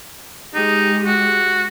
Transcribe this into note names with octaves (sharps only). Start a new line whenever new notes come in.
G#3 D#4 G4
F#4